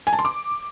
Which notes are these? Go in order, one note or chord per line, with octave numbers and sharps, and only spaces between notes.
G#5
A5
C6
D6